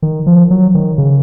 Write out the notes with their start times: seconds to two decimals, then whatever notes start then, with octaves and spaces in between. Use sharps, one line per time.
0.02 D#3
0.26 F3
0.50 F#3
0.75 D#3
0.98 C#3